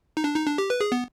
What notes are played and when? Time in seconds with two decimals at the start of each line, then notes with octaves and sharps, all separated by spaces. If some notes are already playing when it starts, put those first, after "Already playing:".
0.17 D#4
0.24 D4
0.36 D#4
0.46 D4
0.58 G4
0.70 B4
0.81 G#4
0.92 B3